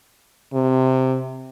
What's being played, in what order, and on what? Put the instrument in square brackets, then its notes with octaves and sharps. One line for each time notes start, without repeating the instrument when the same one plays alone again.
[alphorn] C3